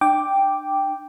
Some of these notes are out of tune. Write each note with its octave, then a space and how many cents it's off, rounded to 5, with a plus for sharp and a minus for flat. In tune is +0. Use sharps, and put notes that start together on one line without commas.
D4 +40 G5 +0 D6 +0